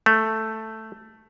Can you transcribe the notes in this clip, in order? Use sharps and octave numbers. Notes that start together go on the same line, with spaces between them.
A3